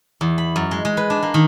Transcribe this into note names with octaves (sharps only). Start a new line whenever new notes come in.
E2
B5
F#2
G#3
G#3
B4
D4
A#3
D#3